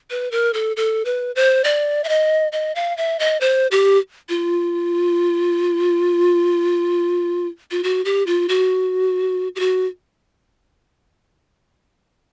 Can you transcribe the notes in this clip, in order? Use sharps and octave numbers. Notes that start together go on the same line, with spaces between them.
B4
A#4
A4
A4
B4
C5
D5
E5
D#5
D#5
F5
E5
D#5
C5
G4
F4
F4
F#4
G4
F4
F#4
G4
F#4